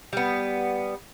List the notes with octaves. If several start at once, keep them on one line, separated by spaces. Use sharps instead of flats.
G3 B3